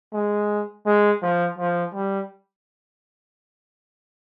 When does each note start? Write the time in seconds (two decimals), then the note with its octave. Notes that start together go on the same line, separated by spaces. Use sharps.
0.13 G#3
0.86 G#3
1.22 F3
1.58 F3
1.94 G3